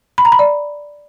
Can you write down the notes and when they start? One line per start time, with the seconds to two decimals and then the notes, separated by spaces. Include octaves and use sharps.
0.18 B5
0.25 A#5
0.32 B5
0.39 D5